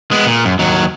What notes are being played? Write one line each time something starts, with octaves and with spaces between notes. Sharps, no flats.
G#3 B3
A#2
F#2
D#2 F#3